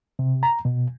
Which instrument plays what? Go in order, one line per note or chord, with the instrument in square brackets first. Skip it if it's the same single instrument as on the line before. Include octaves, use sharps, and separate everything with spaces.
[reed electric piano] C3
A#5
B2